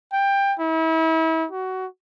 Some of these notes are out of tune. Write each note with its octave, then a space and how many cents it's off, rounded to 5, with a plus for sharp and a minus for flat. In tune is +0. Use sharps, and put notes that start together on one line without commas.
G5 +20
E4 -35
F#4 +20